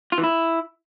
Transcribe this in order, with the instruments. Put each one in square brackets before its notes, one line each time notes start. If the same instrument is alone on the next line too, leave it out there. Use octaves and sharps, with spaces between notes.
[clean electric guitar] F4
E3
E4